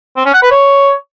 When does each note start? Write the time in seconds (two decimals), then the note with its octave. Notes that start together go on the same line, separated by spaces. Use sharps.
0.17 C4
0.25 C#4
0.34 F#5
0.43 B4
0.51 C#5